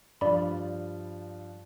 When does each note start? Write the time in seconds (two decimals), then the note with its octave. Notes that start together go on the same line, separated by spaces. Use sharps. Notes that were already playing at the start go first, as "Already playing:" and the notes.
0.21 G2 F3 D5 B5